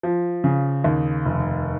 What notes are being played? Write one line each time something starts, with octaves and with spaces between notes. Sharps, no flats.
F3
C#3
D#2
F1